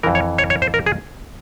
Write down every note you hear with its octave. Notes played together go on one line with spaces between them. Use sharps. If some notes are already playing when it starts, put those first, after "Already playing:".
F2 E3 A#4
C#5
C#5
C#5
C5
A#4
G#4